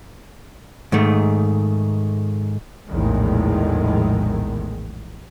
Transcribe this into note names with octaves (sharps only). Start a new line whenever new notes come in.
G#2 D#3 A3
A#1 E2 A2 D#3 G#3